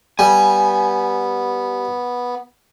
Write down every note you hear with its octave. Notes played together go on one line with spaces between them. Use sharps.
G3 B3 G#5